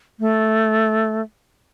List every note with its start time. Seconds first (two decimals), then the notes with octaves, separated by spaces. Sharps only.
0.20 A3